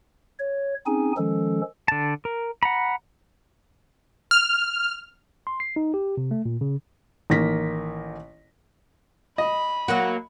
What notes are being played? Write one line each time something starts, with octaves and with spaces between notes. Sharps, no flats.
C#5
C4 C#4 D#4 G#4 G#5
D#3 F3 G#3 C#4 A4
D3 A5
A#4
F#5 A#5 B5
F6
C6
C7
D#4
G4
C3
A3
A#2
C#3
A1 D#3 A#3 A#6 B6
D#5 B5
F#3 A#3 F#4